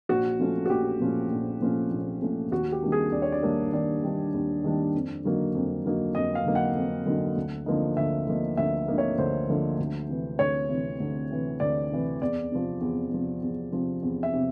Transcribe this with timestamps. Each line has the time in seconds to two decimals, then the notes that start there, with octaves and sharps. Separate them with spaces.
0.09 A#1 F#4
0.39 A#2 F3 A3 C#4
0.66 F#4
0.70 A#1 G4
1.00 A#2 F3 A3 C#4
1.31 A#1
1.61 A#2 F3 A3 C#4
1.91 A#1
2.22 A#2 F3 A3 C#4
2.51 D#2 F#4
2.72 G4
2.83 D#3 G3 A#3 D4
2.92 G#4
3.12 D#2 D5
3.22 C#5
3.32 D5
3.43 D#3 G3 A#3 D4
3.72 D#2 D5
4.03 D#3 G3 A#3 D4
4.34 D#2
4.64 D#3 G3 A#3 D4
4.95 F2
5.24 D3 F#3 A#3 D#4
5.55 F2
5.84 D3 F#3 A#3 D#4
6.15 F2 D#5
6.35 F5
6.45 D3 F#3 A#3 D#4
6.55 F#5
6.76 F2
7.06 D3 F#3 A#3 D#4
7.36 D2
7.66 D3 F3 A#3 D#4
7.97 D2 E5
8.27 D3 F3 A#3 D#4
8.57 D2 E5
8.88 D3 F3 A#3 D#4
8.98 C#5
9.18 D2 C5
9.49 D3 F3 A#3 D#4
9.79 D2
10.09 C3 E3
10.39 D2 C#5
10.70 C3 E3
11.00 D2
11.31 C3 E3
11.60 D2 D5
11.91 C3 E3
12.21 E2 D5
12.52 C3 F3
12.81 E2
13.12 C3 F3
13.43 E2
13.72 C3 F3
14.03 E2
14.23 E5
14.34 C3